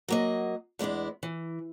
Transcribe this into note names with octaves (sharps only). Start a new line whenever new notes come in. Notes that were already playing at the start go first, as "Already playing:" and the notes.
F#3 A#3 D#5
E2 G#3 B3 D4 E4
E3